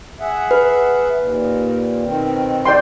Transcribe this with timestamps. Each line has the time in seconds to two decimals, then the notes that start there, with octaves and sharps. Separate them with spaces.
0.20 G#4 E5 F#5
0.51 B4
1.18 D#2 A#2
2.04 B2 D#3 C4
2.66 D5 G5 C6